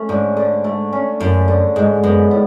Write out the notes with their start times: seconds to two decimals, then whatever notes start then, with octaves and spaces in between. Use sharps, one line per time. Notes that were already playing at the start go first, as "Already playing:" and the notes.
Already playing: A3 C#4
0.09 G#2 D3
0.37 D3
0.64 A3
0.93 C#4
1.20 F#2 D3
1.48 D3
1.76 G#2 G#3
2.03 F#2 B3
2.31 A2